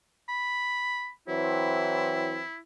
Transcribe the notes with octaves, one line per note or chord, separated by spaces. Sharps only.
B5
E3 F#3 C4 E4